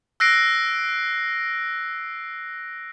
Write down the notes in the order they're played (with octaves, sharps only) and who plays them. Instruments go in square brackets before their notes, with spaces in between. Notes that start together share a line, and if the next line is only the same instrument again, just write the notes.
[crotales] E6 F#6 A#6 C7 D7